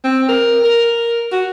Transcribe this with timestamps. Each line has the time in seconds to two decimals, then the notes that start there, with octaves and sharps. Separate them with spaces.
0.04 C4
0.29 A#4
0.64 A#4
1.32 F#4